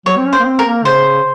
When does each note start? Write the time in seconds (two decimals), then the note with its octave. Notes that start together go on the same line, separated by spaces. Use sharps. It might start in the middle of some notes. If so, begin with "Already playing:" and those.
0.06 F#3 C#5
0.18 C4
0.26 C#4
0.33 C5
0.40 A#3
0.46 C4
0.59 A#4
0.66 A#3
0.85 C#3 C5